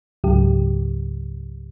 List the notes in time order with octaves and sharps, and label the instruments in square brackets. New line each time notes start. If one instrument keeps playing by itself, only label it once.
[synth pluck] C#2 G#2 C#3 F#3 G4